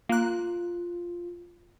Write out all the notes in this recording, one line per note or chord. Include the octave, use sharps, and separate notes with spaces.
A#3 F4 F#6